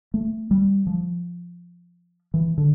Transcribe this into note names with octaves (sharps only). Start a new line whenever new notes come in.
A3
G3
F3
E3
D3